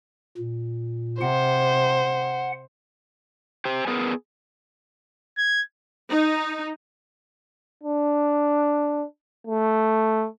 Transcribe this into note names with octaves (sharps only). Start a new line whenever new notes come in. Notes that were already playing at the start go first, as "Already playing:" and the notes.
A#2
C3 C5 F#5
G4 C5
B3 G#4 A#4
G#6
D#4
D4
A3